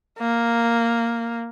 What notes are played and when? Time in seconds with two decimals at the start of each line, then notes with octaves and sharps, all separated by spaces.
0.19 A#3